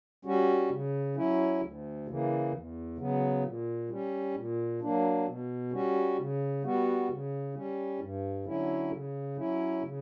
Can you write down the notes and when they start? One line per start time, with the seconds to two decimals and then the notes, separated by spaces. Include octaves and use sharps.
0.25 G3 C#4 F#4
0.70 C#3
1.16 F#3 C#4 E4
1.61 D2
2.07 C#3 E3 A#3
2.52 E2
2.98 C#3 F#3 B3
3.44 A#2
3.89 G3 C#4
4.35 A#2
4.81 F#3 A#3 D4
5.27 B2
5.72 G3 C#4 F#4
6.18 C#3
6.63 G3 B3 F#4
7.09 C#3
7.55 G3 C#4
7.99 G2
8.45 D3 F#3 C#4 E4
8.91 C#3
9.37 F#3 C#4 E4
9.82 C#3